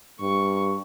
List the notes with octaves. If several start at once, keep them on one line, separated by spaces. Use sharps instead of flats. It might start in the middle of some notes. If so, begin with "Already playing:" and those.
G2 C#6